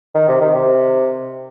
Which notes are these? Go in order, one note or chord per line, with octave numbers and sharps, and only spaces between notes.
D#3
C3
D#3
C3